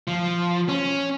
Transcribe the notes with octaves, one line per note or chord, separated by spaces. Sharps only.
F3
C#4